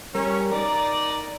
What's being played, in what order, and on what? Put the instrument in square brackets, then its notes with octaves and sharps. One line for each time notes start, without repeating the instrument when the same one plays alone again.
[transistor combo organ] G3 A#4 [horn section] C#4
[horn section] D#4 A#4 D5 [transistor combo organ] A#5